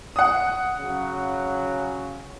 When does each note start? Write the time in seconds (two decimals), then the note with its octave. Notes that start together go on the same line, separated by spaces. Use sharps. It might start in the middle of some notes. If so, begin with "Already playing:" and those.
0.16 F#5 D#6
0.79 C#3 F#3